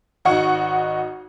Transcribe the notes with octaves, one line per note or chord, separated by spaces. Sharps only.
G#1 D#4 F#4 F#5 C#6 C#7